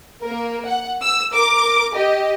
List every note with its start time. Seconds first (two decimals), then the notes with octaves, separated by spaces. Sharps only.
0.24 A#3 A#4
0.65 F#5
1.01 E6
1.31 A#4 D6
1.95 G4 D#5